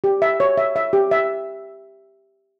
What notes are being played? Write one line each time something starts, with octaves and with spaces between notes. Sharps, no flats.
G4
E5
C#5
E5
E5
G4
E5